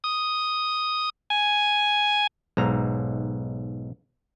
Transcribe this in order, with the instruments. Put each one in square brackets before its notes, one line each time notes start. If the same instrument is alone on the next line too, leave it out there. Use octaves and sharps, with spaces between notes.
[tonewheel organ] D#6
G#5
[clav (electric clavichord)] B1 G#2 A#5